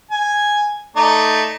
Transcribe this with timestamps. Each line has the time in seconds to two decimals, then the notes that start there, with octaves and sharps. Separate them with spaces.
0.11 G#5
0.96 A3 D#4 D5